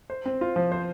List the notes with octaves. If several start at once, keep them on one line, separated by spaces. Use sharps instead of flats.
C5
C4
F4
F3
C5